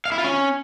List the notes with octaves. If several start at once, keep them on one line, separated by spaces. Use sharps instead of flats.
F5
E4
F4
C#4